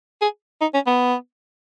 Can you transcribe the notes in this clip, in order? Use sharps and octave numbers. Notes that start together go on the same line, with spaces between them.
G#4
D#4
C#4
B3